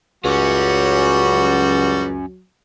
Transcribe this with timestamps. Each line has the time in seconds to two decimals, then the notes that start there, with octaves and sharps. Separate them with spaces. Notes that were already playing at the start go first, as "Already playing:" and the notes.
0.25 C#2 F#2 F#3 G3 C#4 F#4